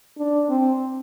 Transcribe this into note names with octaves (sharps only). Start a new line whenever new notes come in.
D4
C4